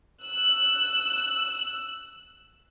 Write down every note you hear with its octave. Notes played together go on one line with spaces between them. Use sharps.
E6 F#6